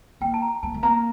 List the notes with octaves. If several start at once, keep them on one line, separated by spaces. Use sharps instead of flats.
A#3 G5
A5
A#5
A#3 A5
A3
A#3 A#5